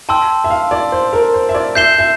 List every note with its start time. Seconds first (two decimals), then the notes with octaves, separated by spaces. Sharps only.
0.09 G5 A5 C6 E6
0.44 E5
0.50 F5
0.71 D5
0.92 C5
1.13 A#4
1.34 C5
1.49 E5
1.54 D5
1.75 E5 G6 C7 E7 G7
1.99 E5